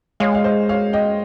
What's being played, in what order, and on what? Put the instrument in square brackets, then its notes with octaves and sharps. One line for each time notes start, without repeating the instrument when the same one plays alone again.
[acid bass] G#3 [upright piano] C#5 F5
[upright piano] F5
C5 D#5
C#5 F5
D#5 G5